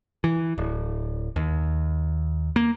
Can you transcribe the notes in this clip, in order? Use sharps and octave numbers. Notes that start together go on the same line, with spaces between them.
E3
D1
D#2
A#3